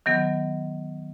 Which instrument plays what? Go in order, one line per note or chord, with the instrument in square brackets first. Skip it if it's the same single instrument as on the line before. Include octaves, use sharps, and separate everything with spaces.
[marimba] D#3 F#3 B3